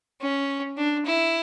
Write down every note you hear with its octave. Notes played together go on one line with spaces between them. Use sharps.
C#4
D4
E4